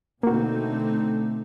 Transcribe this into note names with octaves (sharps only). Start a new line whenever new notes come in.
B2 D3 A3 A#3 C4 D#4 F#4